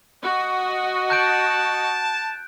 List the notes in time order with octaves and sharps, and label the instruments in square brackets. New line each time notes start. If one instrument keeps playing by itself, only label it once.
[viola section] F#4 D#5
[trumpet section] A5 [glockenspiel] F#6 G6 D7